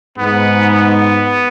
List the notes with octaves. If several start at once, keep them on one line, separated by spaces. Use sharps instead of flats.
G#2 B3
B3